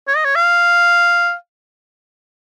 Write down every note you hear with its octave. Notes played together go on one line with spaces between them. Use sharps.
C#5
D#5
C#5
F5